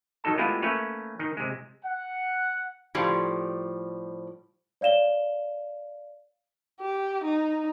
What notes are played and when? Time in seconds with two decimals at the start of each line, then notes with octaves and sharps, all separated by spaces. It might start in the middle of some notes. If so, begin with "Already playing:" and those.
0.24 D#3 F#3 D#4 A4 A5
0.38 G#3 A3 B3 E4 F4 G4
0.62 A3 A#3 C#4 B4 C#5
1.19 D#3 D#4
1.37 C3 G#3
1.83 F#5
2.95 A2 F3 G3
4.81 C#5 D5 F5 E7 G7
6.81 G4
7.24 D#4